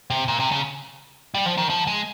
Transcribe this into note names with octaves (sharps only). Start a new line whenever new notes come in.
C3
A#2
C3
C#3
G3
F3
D#3
F3
G#3